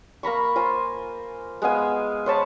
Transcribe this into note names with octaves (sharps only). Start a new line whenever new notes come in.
A#3 A#5 B5 C#6
F4 C5 G#5
G#3 B3 F5 G#5
C5 C#5 A5 B5